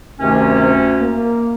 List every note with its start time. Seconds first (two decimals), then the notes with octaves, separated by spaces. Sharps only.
0.20 D2 G2 C3 D#3 C#4
1.00 A#3